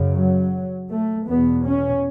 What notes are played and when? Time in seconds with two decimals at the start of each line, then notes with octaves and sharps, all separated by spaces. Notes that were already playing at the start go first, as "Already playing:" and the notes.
Already playing: F#2 C#3
0.12 F#3
0.89 A3
1.26 E2 B2 B3
1.65 C#4